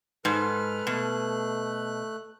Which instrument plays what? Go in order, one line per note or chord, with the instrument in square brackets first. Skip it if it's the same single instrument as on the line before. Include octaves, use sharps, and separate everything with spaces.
[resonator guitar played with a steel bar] G#2 [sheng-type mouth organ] A4 B4 F6
[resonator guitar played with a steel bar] B2 [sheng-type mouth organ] A3 F#6